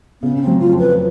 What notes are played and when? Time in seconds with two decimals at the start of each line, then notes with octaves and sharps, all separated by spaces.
0.21 C#3 B3
0.36 C#4
0.41 C4
0.47 F#3
0.60 F4
0.72 F2
0.79 B4